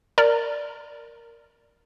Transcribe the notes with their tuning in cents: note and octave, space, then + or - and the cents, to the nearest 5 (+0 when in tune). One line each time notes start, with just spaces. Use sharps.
A#4 +0 D5 +0 A#5 -20